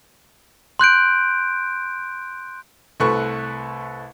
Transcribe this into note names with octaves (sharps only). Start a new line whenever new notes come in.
C6 F#6 G6 D7
C2 A3 B4 C#6 F#6